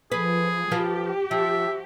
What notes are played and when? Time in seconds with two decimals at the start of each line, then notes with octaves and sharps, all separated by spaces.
0.12 F3 G#4 B4
0.71 F3 F4 G4 B4
1.31 F3 E5